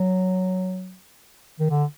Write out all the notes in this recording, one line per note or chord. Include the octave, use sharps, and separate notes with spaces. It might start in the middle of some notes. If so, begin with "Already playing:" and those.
Already playing: F#3
D#3
D3